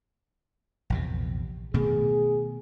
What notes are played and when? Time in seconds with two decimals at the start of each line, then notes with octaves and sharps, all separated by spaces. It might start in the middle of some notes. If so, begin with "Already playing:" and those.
0.90 A#1 E2 C3
1.74 B2 D#3 A3 G#4